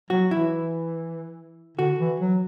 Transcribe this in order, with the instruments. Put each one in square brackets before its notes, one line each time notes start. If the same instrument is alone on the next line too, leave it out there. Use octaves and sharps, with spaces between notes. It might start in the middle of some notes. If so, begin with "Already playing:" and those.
[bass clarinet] F#3 [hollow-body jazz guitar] F#4
[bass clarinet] E3 [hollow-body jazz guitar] E4
[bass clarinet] D3 [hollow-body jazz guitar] F#4
[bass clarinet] E3
F#3